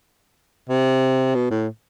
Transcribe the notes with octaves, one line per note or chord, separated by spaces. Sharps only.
C3
B2
A2